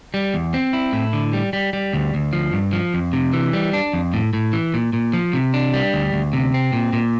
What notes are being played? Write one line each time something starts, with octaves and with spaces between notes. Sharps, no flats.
G3
E2
C4
E4
A2
D3
G3
G3
G3
D2
D2
F3
G2
F3
F2
C3
E3
G3
D4
F2
A2
A2
E3
A#2
A#2
F3
C3
D4
G3
D2
D2
C3
C4
A#2
A#2